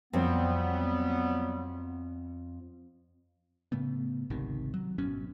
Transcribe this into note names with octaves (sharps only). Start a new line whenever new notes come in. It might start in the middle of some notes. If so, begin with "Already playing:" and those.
F2 F#3 G3 B3 C4
A2 C#3 A3 B3
G#1 C#2 C3 D#3
F#3
G#1 F#2 B2 C#4